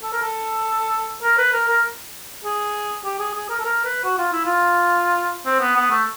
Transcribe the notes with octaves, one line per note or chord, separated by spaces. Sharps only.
A4
A#4
A4
A#4
B4
A#4
A#4
G#4
G4
G#4
G#4
A#4
A4
A#4
B4
F#4
F4
E4
F4
C4
B3
B3
A3